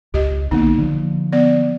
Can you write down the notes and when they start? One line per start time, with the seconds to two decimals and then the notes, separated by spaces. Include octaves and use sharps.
0.14 C#2 G4 D#5
0.51 A#1 D3 A#3 B3 D#4
0.78 D3 F3
1.33 B3 D5